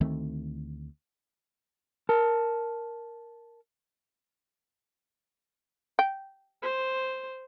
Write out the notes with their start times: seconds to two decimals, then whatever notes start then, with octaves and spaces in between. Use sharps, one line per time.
0.01 D2 D#3 A3 C4
2.09 A#4 A5
5.99 G5
6.62 C5